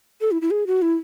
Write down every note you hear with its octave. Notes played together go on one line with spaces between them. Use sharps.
A4
E4
E4
G#4
F#4
E4